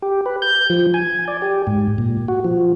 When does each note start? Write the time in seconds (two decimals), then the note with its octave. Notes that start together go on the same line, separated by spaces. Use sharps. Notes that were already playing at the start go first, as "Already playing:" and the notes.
0.02 G4
0.26 B4
0.42 G6
0.70 F3
0.94 G#5
1.28 D5
1.42 G4
1.67 G#2
1.98 A#2
2.28 F#4
2.44 F3